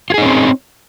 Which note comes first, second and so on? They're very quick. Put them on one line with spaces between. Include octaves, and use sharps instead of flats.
F4 G#4 D#4 C#4 C4